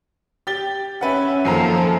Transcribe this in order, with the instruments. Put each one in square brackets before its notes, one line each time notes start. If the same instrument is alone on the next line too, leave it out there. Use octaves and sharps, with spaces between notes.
[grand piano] G4 A6 G7
[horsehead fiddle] C#4 E5 [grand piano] B4 F#5
[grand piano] F#2 D#3 A#5 [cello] F3 [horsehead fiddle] A#3 A4